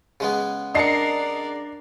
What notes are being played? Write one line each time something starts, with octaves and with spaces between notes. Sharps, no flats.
C#3 G#3 B3
D4 A#4 D5 D#5 A5 C7 C#7